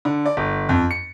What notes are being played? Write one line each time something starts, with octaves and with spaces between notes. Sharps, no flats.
D3
D5
G1
F2
C#7